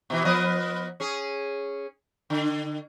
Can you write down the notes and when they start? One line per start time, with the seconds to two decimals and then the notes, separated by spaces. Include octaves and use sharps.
0.10 B2 E3
0.25 F3 B3 D#5
1.00 C#4 G#4
2.30 D3